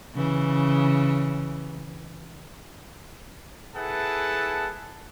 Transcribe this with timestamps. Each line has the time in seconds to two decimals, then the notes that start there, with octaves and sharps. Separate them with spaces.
0.14 C#3 E3
3.76 E4 G#4 A4 B4 F#5 A5